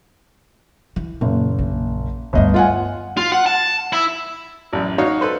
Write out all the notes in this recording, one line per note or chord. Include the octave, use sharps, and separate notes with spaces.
E3
F#1 A#2
A#1
G1 D2 G2 D#5
F4 F#5 G#5
F4
F#5
A5
E4
A1 F#2
D#4 F#4 C#5 F5
A4 B4 C5